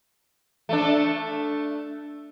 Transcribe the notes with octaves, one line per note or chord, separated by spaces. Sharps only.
A3 D4